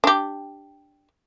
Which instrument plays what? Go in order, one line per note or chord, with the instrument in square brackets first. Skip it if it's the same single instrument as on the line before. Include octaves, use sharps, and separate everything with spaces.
[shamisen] D4 G4